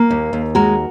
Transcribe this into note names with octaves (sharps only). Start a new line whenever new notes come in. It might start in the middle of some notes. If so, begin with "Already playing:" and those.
Already playing: A#3
D#2
D#2
G#3 F#4 A#4